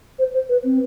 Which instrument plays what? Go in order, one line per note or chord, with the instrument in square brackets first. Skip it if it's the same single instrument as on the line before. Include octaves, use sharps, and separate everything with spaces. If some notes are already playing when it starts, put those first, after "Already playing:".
[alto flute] C5
C5
B4
C4